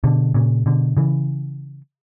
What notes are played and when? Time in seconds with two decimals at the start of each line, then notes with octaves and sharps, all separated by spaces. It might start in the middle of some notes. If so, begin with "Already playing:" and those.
0.04 B2 D3
0.34 A#2 C#3
0.66 B2 D3
0.97 C#3 E3